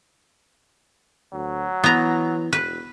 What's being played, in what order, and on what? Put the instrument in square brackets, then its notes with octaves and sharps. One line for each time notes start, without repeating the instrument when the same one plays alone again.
[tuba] D2 [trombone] F#3
[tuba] E3 [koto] B3 A#5
[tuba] E1 [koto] B4